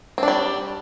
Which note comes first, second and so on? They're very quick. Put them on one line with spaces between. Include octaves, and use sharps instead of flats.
C4 D4 G3